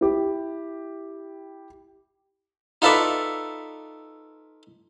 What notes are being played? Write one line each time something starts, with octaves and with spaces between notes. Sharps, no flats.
E4 G4
D#4 F4 A4 B4 D5 E5